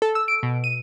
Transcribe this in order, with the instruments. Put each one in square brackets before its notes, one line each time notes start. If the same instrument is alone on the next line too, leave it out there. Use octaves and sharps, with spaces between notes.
[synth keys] A4
E6
D7
B2
D#7